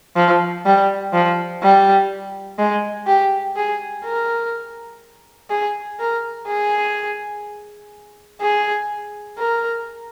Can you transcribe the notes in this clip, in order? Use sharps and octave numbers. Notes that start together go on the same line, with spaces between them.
F3
G3
F3
G3
G#3
G4
G#4
A#4
G#4
A#4
G#4
G#4
A#4